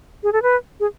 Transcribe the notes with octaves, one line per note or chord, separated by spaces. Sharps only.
G#4
A4
B4
G#4